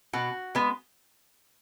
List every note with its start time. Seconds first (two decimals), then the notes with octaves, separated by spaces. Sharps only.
0.13 B2 F#4
0.55 G#3 B3